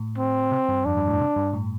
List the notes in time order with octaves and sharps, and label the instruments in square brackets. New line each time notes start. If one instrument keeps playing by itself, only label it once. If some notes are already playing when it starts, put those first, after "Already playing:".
Already playing: [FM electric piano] A2
[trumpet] C4
[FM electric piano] C3
G2
[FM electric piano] F2 [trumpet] D4
[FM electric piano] G2
A2
C3
G2
A2